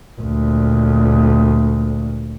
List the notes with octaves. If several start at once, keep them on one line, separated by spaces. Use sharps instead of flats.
D2 A#2